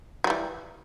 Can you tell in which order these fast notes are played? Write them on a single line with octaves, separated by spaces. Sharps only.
F#3 G3 E3